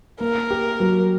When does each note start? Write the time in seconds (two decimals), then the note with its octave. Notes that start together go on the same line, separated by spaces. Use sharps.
0.20 A#3 A#4
0.50 G4
0.80 F#3